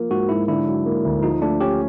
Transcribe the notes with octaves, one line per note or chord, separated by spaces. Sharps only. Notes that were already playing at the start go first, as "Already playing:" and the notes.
Already playing: F3 A#3
G#2 F#4
G#2 E4
D3 E4
F#3
A#3
D2
F3 D#4
A3 D4
C#4 G4